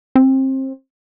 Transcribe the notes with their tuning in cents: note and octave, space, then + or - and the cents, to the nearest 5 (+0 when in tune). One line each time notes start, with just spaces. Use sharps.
C4 +25